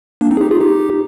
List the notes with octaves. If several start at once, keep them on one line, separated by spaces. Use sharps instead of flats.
A#3 D4
C4 D#4
G#4
D#4 G4
F4 G#4
D#4 G4